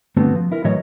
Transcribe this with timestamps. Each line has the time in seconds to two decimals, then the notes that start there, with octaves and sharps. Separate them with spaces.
0.17 G2 D3 A3 B3 C4 F#4
0.35 F3
0.52 E4 A#4
0.64 A2 E3 F#3 C#5 D#5